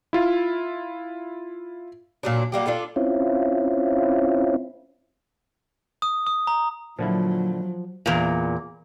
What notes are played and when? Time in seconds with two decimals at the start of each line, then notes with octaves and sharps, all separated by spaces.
0.13 E4 F4
2.23 A#2 F#3 D4
2.52 F#3 G3 A#3 G4
2.67 D4 F4 A4
2.96 C4 C#4 E4 F4
6.02 D#6
6.27 D#6
6.47 A#5
6.99 A#2 D3 F3 F#3 E4
8.06 E2 A#2